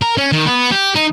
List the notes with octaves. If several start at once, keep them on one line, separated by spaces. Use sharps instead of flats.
A#4
C#4
D#3
B3
G4
D#4